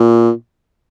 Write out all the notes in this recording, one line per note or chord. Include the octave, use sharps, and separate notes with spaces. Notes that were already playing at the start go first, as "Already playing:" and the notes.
Already playing: A#2